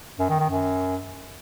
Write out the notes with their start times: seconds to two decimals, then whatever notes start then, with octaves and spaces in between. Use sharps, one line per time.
0.19 F#2
0.29 D#3
0.39 D#3
0.49 F#2